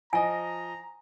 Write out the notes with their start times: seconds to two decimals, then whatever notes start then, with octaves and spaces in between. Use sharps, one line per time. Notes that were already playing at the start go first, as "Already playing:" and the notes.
0.13 F3 D#5 G#5 A#5